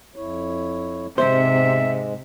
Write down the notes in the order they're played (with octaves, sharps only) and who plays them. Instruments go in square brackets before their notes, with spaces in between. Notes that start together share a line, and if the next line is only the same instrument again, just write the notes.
[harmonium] F2 E4 C#5
[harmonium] G#2 G#3 [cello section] C3 [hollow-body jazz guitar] C5 [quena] E5